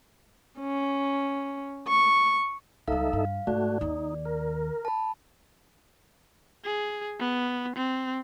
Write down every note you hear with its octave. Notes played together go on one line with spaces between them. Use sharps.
C#4
C#6
C#2 G3 D#4 A4 E5 F5
G2
G#2 A3 F#4 D5
D#2 D#3 D#4
A#4
A5 B5
G#4
B3
C4